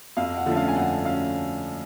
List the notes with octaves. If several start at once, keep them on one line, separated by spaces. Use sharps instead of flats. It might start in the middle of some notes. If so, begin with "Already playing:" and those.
F2 F5
F#5
D3 F3 A3 C#4
F5
G#5
F2 F#5
C#4 F5